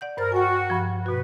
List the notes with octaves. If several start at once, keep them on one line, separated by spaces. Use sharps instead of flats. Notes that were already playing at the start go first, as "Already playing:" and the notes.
D5 F#5 G6
G2 A#4 C5 A6
F#4 G5 G#5
G2 F3
B2 F#4 B4